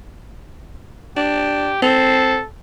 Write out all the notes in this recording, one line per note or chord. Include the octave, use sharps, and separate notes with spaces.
D4 G4
C4 A4